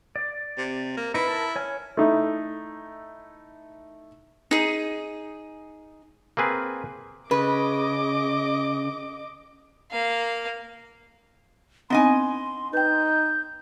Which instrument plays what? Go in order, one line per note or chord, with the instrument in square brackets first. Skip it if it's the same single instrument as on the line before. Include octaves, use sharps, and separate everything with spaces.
[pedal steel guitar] D5
[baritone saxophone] C3
A#3
[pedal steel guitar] D#4 B4 [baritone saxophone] E4
[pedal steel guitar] A#4 A5
C#5 G#5 F6
[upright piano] A3 D#4 E4
[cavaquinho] D#4 G#4
[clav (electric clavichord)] A#3 C4 G#4 B4
[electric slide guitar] C#3 [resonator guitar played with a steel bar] B4 [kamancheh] D#5 D6
[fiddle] A#3 F5
[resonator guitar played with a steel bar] B3 D#5 G#5 [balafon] C4 D4 D#4 [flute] C6
[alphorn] D#4 [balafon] B4 G5 [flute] G6